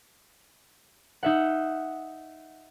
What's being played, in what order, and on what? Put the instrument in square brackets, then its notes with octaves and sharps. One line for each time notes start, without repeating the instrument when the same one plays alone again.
[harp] D#4 E5 F#5